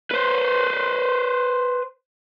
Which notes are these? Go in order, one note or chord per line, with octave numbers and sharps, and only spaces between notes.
B4 C5